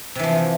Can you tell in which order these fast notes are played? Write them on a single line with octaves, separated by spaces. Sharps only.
C3 E3 F3